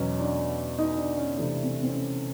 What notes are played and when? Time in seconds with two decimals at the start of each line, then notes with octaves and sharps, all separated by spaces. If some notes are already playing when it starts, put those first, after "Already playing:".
Already playing: E2 B2 F#3 C#4
0.19 D4
0.78 D#4
0.97 D4
1.17 C#4
1.37 C3 E3 A3 D4
1.64 C4
1.83 C4
1.90 C#4